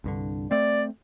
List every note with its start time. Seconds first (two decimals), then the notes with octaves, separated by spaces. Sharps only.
0.04 C2 G2 D3
0.51 A3 C4 D5